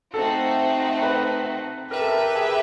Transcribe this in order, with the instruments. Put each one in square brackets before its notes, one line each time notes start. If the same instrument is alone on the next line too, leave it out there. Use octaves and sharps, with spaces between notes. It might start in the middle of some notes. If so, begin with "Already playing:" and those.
[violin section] A3 C4 D#4 F#4 [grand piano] A4
[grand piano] B4
[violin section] G4 B4 E5 [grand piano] A#4
[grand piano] A4
A#4
G#4